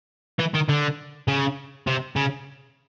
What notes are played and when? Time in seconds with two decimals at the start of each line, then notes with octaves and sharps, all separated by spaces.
0.39 E3
0.55 D#3
0.69 D3
1.28 C#3
1.87 C3
2.16 C#3